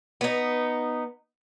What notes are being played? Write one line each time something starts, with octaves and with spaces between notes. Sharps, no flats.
B3 D#4